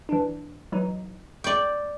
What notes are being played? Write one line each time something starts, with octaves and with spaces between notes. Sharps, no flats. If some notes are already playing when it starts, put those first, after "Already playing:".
E3 D4
E3 F#3 D#4
D5 G5 C#6